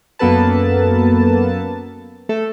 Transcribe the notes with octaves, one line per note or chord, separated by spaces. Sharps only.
F#2 A#3 B3 A4 B4 A5
A3 A4